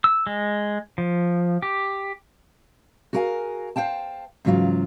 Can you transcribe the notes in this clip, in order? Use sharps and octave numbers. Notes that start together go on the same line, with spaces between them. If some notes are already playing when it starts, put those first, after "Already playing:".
E6
G#3
F3
G4
F#4 G#4 A#4 C5 F5 G#5
C5 C#5 F5 G5 A5
G#2 C#3 E3 F#3 F4 F5